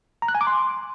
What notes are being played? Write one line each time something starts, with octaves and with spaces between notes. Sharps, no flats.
A#5
F#6
G#5
D6
C6